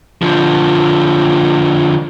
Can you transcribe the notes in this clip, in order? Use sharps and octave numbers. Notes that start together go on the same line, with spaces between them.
D3 F3